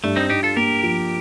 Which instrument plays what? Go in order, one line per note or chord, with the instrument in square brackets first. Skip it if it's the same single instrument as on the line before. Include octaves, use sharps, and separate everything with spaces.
[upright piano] G2 [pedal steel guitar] A3
[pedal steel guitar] C4 D#4
[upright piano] G2 [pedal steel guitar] D#4 G4
[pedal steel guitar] F4 A4
[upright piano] A#3 [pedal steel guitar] G4 A#4
[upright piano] F3